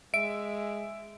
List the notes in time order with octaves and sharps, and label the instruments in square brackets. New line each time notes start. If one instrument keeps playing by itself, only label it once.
[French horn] G#3 [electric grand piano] E5 [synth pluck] D7